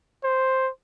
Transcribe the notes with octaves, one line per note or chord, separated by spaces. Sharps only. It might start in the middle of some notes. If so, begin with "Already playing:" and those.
C5